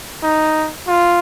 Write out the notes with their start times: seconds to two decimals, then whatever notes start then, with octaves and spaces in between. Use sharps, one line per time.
0.23 D#4
0.88 F4